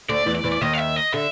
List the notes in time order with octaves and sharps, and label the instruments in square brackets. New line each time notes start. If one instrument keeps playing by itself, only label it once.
[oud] D2 D3 [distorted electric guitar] D5
[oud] E2 E3
[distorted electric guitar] D5
[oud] E2 E3
[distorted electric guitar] D5
[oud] D#2 D#3 [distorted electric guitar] D#5
[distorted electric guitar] F5
E5
D#5
[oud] D3 [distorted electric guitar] E5